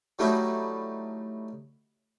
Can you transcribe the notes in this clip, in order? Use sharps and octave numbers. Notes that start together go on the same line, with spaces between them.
F#3 G3 A3 D#4 E4 F#4